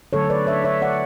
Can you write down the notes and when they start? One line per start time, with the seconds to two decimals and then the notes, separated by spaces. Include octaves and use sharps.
0.13 D3 F#3 A3 A4 C#5
0.30 B4 D5
0.47 C#5 E5
0.64 C#5 E5
0.82 D5 F#5